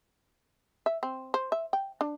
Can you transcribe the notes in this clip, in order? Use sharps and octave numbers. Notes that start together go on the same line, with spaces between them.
E5
C4
C5
E5
G5
D4